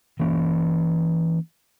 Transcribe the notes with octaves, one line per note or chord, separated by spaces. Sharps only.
E3 A#3 C#4